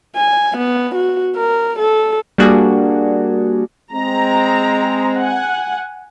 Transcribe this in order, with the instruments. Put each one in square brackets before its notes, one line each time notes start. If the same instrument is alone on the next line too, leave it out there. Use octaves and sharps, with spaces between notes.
[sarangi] G#5
B3
F#4
A#4
A4
[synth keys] G3 A#3 D4 F#4 G#4
[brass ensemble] G#3 C4 [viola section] A#5
[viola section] F#5 G#5